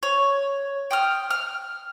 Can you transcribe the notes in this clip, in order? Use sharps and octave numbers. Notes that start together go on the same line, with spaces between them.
C#5
G5 D#6 F6
F6